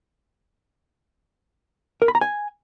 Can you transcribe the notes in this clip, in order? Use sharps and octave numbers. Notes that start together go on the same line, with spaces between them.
A#4
B5
A#5
G#5